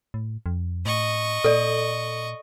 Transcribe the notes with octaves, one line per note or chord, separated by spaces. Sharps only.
A2
F2
A2 D#5 C#6
A#2 A4 D5